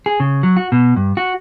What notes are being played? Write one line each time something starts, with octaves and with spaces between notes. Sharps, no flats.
G#4
C#3
F#3
F#4
B2
G2
F#4